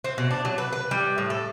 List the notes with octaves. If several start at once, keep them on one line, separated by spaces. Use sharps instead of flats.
C4
B2
D4
F#3
B4
B4
G3
A2
A4